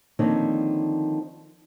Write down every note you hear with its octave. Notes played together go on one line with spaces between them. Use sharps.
D3 D#3 F3 A#3 C4 C#4